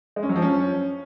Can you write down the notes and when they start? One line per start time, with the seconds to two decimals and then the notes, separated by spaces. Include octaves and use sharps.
0.16 G#3
0.23 C#4
0.29 F#3
0.36 F3
0.42 C#4